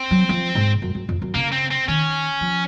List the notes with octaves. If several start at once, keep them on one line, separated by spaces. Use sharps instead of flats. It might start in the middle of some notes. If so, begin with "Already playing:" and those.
Already playing: C4
F#3
F3
G#2
F#2
F#2
F2
F#2
C#3 A#3
C4
C4
D#3 C#4
F3